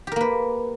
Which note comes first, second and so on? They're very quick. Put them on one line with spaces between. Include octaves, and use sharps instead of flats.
G4 A#4 A#3 B4